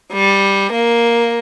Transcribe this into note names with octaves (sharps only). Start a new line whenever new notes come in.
G3
A#3